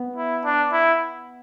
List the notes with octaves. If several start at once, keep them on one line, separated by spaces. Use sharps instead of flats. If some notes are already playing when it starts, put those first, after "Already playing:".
Already playing: B3
E4
D4
E4